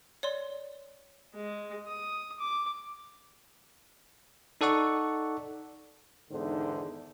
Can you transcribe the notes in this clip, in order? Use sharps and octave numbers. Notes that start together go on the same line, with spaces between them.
C#5 D5 C6
G#3
D#6
D6
D#4 A4 D5 F#5 C#6
E2 G#2 D3 D#3 C5